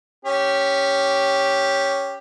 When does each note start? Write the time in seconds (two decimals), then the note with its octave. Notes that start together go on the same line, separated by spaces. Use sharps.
0.25 C#4 G4